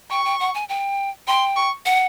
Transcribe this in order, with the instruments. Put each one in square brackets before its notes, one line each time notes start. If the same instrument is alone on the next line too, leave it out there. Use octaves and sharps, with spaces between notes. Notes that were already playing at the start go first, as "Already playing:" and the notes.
[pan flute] G5 [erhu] C#6
[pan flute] G5
F#5
G#5
G5
[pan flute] G5 [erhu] C6
[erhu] C#6
[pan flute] F#5